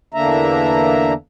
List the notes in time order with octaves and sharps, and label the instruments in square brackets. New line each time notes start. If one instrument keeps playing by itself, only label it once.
[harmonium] E2 D3 A#3 D4 E5 A#5